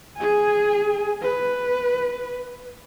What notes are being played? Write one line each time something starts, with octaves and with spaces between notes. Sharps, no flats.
G#4 G#5
B4